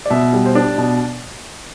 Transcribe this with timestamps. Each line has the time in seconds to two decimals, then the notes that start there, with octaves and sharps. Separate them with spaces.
0.06 D5
0.10 B2 E5
0.33 G3
0.45 C5
0.55 D4 D5
0.78 B2